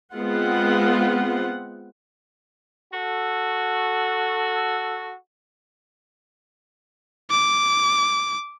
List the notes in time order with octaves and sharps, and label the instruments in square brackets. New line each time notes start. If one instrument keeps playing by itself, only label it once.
[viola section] G#3 B3 C4 F4 F#5
[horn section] F#4 A4
[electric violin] D6